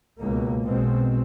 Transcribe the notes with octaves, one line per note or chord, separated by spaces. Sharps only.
C#2 B2 A#3
B1 B2 G#3 C4